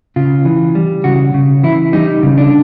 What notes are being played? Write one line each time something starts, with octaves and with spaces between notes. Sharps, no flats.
C#3 F4
E3
G3
C#3 F#4
C#3
E3 E4
G3 D#4
C#3
D4